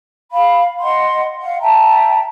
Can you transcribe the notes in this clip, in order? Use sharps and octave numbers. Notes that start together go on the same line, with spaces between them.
F5 B5
D#5 F#5 C6
F5 F#5
E5 G5 A5 A#5